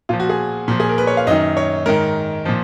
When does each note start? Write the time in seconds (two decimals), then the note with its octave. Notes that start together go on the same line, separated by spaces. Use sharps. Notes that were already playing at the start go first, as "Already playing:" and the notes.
0.09 A#2 F3 F4
0.20 F#4
0.29 G#4
0.68 A#2 F3
0.80 G#4
0.89 A#4
0.98 B4
1.07 C#5
1.17 F5
1.27 F#2 D#5
1.31 D#3
1.57 C#5
1.86 G#2 D#3 A#4
2.45 A#2 F3